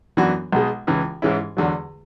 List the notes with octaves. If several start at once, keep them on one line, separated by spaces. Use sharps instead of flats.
F#2 E3 B3 D4 F#4
B1 B2 G#3
C#2 C#3 E3
G#2 E3 G#3 C#4 E4
E2 D3 F#3